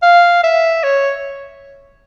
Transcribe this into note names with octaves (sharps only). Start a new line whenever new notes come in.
F5
E5
C#5